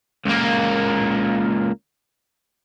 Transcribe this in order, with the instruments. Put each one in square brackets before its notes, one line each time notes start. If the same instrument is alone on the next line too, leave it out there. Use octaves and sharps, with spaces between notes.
[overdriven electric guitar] C#2 A#3